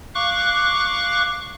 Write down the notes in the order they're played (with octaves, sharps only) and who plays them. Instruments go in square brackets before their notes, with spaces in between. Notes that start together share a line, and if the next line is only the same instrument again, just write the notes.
[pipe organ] F5 C#6 D6 F#6